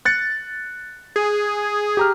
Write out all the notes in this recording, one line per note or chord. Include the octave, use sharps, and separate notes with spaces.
F#6 A6 C#7
G#4
G4 A#5 F6